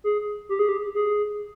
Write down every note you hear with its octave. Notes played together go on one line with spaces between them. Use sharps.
G#4
G4
G#4
G4
G#4